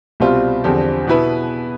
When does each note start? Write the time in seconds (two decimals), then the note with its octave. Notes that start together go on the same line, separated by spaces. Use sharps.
0.20 C2 B2 G3 C4 F4
0.64 E2 D3 F3 C4 G4
1.07 B2 B3 E4 B4